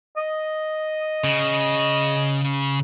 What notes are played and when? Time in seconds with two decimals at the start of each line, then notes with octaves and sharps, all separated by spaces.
0.17 D#5
1.24 C#3